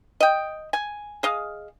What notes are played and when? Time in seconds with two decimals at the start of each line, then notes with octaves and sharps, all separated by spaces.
0.20 D#5 G5
0.73 G#5
1.23 G#4 D#5 F5